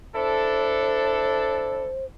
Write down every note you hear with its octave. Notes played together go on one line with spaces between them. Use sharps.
D4 E4 A4 C5